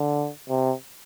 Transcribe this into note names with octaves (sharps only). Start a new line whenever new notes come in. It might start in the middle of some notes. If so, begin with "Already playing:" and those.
Already playing: D3
C3